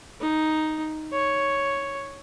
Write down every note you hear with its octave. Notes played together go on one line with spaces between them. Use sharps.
D#4
C#5